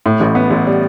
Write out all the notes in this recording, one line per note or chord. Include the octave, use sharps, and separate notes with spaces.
A2
A1
B3
A1
G3